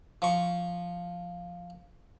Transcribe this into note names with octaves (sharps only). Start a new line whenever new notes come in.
F3 C#6